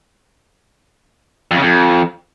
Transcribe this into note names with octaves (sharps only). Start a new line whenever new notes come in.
F2
C#3
F2